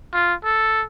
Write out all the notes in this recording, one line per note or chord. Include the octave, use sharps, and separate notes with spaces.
F4
A4